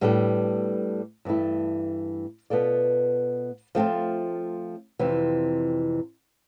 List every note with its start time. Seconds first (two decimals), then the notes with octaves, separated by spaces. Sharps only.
0.01 A2 G3 B3 D4 A4
1.25 G2 E3 A3 E4
2.50 B2 B3 F4 A4 D5
3.75 F3 A3 C4 F4
4.99 F2 C3 E3